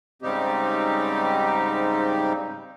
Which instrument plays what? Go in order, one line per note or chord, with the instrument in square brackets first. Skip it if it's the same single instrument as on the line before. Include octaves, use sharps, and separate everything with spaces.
[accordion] G#2 C#3 G3 C4 D#4 G4